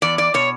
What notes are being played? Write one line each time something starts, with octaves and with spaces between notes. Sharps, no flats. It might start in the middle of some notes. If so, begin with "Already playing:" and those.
E2 D5
D5
B2 C#5